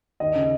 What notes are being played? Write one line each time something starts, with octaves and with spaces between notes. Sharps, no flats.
D#2 D#5
C#3